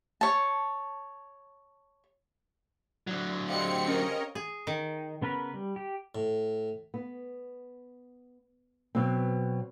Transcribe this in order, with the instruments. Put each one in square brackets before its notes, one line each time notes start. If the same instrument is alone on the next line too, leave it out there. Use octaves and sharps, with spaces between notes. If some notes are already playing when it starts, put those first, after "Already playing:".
[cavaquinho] C#5 A5
[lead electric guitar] D3 F#3 [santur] D4
[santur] G3 G#3 F5 [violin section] C4 C#7
[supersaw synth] C#4 A#4 D#5
[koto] G#4
D#3
[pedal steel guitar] C#3 B3 A#4 B4
G3
G4
[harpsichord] A2
[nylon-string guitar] B3
B2 F#3 C4